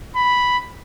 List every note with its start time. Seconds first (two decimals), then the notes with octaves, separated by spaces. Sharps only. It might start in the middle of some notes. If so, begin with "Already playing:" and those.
0.16 B5